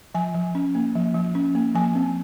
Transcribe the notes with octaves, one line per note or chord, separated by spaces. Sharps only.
F3 G#5
F3
C#4
A#3
F3
F3
C#4
A#3
F3 G#5
C4